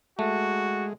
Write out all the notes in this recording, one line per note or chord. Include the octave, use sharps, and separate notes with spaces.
G#3 A3 F#4